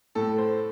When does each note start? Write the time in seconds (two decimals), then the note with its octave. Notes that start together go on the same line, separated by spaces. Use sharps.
0.15 A2 A4
0.38 C5